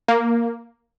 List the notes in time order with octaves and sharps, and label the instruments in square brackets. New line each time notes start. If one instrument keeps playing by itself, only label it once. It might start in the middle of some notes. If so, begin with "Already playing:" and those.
[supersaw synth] A#3